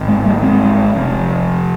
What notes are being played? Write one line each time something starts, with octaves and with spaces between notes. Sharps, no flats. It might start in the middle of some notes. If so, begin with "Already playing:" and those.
Already playing: G#1
G#3 C4
G3 A#3
G#3 C4
F1 F2 C3